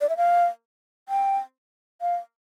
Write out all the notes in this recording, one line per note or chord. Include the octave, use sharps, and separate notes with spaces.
D5
E5
F5
G5
F5